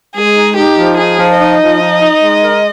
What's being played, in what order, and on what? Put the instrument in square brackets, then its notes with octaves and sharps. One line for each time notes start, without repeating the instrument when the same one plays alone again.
[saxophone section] G#3 [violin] G#4
[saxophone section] D#4
[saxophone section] D#4 [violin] G4
[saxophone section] F3
[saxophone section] D#4 [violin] G#4
[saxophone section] F3
[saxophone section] D#4 [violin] D#5
[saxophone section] F3
D#4
D#4
G#3
A#4